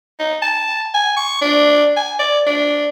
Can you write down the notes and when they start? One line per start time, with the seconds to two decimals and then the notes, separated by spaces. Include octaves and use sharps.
0.20 D#4
0.42 A5
0.94 G#5
1.17 C#6
1.42 D4
1.96 G#5
2.19 D5
2.47 D4